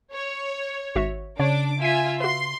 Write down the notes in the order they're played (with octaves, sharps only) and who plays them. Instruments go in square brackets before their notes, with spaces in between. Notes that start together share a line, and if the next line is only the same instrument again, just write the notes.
[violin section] C#5
[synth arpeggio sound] G#1 F#4 E5
[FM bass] C#3 [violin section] D4 D6 [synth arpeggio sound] C#5
[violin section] F4 E5 G#5 [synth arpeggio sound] B6 D#7
[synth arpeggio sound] F#4 B4 [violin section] C6